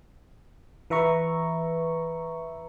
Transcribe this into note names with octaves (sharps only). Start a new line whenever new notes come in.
E3 B4 E5 A#5 C#6